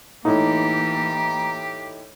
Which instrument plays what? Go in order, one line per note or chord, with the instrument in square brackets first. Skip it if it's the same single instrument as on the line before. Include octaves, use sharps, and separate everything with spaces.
[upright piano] A2 D#4 [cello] E3 A#3 [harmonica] G4 [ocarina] A#5